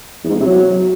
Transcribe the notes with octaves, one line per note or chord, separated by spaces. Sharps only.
E2
G#2
E2
C3
F#3